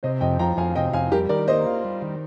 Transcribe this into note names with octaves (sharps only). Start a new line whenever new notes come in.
C3 C5 D#5
F2 D#5 G5
F3 G5 A#5
F2 F5 G#5
C3 D#5 G5
F2 F5 G#5
G3 G4 A#4
D#3 A#4 D5
A#3 C5 D#5
F4
G3
D#3